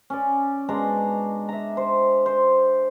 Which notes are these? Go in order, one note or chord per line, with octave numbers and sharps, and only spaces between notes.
C#4 D5
B2 G#3 D4 A#5
E5 A#5
C5
C5